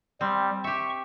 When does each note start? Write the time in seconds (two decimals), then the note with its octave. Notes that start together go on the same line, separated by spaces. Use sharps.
0.21 G3 C4
0.64 G4 E5 C#6